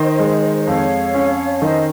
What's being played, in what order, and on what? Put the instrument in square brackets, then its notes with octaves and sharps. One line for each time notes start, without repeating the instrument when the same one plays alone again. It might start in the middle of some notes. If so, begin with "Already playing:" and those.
Already playing: [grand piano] D#3 [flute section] C5 D#5
[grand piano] G#3
[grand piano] F2 [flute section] C#5 F5
[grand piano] C#4
[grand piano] D#3 [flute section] C5 D#5